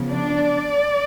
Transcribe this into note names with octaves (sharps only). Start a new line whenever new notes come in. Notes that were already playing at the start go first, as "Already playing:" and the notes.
Already playing: C#3 F3 B3
D4 D5